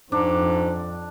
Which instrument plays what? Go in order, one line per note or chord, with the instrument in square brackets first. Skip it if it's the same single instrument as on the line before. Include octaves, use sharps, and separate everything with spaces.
[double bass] F2 [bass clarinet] G#2 [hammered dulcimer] D4